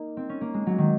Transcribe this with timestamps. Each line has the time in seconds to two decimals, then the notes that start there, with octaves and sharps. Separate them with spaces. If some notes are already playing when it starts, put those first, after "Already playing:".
Already playing: A#3 D#4
0.17 C4
0.29 C#4
0.41 A#3
0.54 G#3
0.67 F#3
0.78 D#3